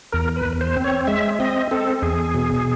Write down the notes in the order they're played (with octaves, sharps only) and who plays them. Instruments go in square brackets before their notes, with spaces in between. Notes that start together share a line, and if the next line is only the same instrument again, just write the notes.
[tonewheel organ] E2 A#4
B4
E2
C5
C4
C#5
G#3 E5
C4 D#5
C4 A4
E2 G#4
B2